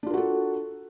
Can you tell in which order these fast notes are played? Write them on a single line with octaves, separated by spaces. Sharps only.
D4 F4 A#4 F#4 A4